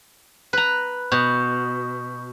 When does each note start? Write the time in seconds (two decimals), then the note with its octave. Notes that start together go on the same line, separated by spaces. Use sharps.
0.53 B4 A#5
1.12 B2 C#6 G6